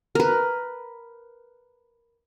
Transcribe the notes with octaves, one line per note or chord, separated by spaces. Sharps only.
A#4 B4